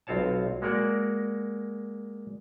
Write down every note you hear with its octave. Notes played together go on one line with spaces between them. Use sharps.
B1 C4 F4 C#5 A5
G#3 A#3 F#4 A#4 D5